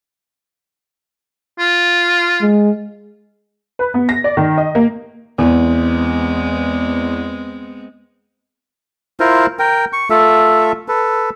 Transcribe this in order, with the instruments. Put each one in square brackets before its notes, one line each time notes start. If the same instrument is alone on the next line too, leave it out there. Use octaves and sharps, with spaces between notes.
[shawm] F4
[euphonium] G#3
[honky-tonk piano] B4
B3
A#6
D5
D#3
D#5
A#3
[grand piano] E2 [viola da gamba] G#3 B3 C4
[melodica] E4 F4 A#4 C5
A#4 G5
C#6
A3 F4 A4 E5
A4 B4